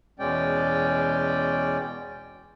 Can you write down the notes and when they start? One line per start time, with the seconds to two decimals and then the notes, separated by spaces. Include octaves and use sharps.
0.19 E2 B2 G#3 C#4 D5 G5